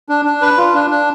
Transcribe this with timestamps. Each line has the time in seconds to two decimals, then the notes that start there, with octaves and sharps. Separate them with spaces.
0.09 D4
0.25 D4
0.42 B4
0.58 F4
0.74 D4
0.90 D4